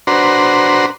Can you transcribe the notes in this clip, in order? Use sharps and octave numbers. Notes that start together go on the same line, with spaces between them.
D4 F#4 B4 C5 A#5 C6